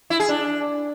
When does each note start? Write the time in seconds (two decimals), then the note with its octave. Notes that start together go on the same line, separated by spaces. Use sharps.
0.10 E4
0.20 G#4
0.29 D4